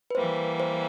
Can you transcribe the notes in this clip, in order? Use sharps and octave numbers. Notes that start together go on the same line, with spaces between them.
B4
E3 G3 A#3 C5
C5